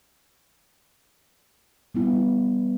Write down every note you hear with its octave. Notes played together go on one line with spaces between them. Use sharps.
G3 B3 E4